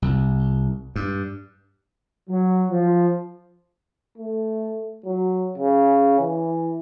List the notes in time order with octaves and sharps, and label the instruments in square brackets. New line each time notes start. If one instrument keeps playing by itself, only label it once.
[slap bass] C2
G2
[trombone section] F#3
F3
[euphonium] A3
F#3
C#3
E3